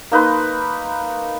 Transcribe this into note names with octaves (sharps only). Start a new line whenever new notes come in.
A#3 D#4 B4 C6